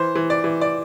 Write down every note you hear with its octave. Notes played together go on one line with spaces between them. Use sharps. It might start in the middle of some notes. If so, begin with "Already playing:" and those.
Already playing: E3 C5
E3
D5
E3
D5